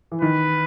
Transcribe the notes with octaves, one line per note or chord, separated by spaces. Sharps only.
E3
D#3 B4